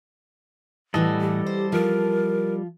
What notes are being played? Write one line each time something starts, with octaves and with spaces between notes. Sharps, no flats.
A2 E3 G3 F#4 A4 D#5
G4
C5
F3 F4 A#4